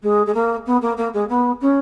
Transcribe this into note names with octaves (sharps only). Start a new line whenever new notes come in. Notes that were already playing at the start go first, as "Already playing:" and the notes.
G#3
G#3
A#3
B3
A#3
A#3
G#3
B3
C#4